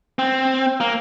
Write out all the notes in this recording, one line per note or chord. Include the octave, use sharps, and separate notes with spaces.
C4
A#3